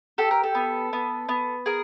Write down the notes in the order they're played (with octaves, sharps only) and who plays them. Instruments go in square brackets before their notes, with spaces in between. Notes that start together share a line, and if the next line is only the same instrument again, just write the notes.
[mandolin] G4 A4
A#4
A4
B3
B3
B3
G#4 A#4